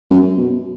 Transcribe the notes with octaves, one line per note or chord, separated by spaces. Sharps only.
F#2
B2